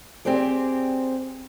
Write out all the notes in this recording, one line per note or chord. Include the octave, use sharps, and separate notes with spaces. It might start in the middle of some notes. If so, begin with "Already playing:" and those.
C4 G4 G#4 C5 D5